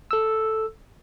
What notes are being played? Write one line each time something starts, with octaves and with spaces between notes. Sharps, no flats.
A4 E6